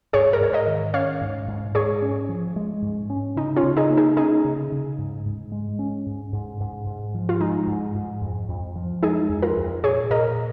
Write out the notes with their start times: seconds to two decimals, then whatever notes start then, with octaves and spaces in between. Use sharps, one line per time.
0.13 G#2 G#4 C#5
0.33 A#4
0.41 G#2 C#5
0.53 A#4 D#5
0.67 D#3
0.94 C#4 C#5 F5
1.21 G#2
1.48 G#2
1.75 G#2 G#4 C#5
2.02 C#4
2.29 F3
2.56 G#3
2.82 G#2
3.10 C#4
3.36 C#3 D#4
3.56 C#4 F4
3.63 C#3
3.77 D#4 G#4
3.90 A#3
3.97 D#4 G#4
4.17 C#4 D#4 G#4
4.45 C#3
4.72 C#3
4.98 G#2
5.26 G#2
5.52 G#3
5.79 C#4
6.06 G#2
6.33 G#2
6.60 G#2
6.87 G#2
7.14 F3
7.29 F4
7.40 G#3 D#4
7.67 G#2
7.95 G#2
8.22 F2
8.49 F2
8.76 F3
9.02 G#3 D#4 G#4
9.29 F2
9.42 F4 A#4
9.57 F2
9.84 A#2 G#4 C#5
10.10 A#2 A#4 D#5